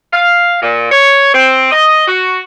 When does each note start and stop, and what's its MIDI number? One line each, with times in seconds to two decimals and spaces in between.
0.13 0.57 77
0.62 0.91 46
0.92 1.34 73
1.34 1.68 60
1.72 2.05 75
2.08 2.41 66